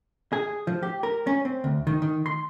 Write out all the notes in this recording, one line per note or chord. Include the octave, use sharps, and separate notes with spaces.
G#4
F3
G4
A#4
C#4
C4
D2
D#3
D#3
C6